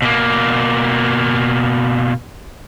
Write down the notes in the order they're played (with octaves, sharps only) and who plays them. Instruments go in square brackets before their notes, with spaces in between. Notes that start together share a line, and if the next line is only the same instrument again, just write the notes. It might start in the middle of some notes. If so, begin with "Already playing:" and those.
[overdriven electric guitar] B2 A#3